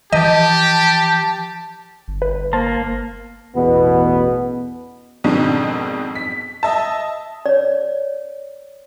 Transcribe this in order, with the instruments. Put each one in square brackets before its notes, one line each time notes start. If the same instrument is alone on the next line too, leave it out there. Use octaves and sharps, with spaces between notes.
[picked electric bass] E3 F3 [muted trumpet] G4 [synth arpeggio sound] D#5 [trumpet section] A5
[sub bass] G1
[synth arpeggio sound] B4
[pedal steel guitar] A#3 [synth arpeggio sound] C5 A5
[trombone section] A1 E2 B2 B3
[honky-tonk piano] F2 G#2 B2 D#3 C4 D4
B6
D#5 E5 A5
[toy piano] C#5 D5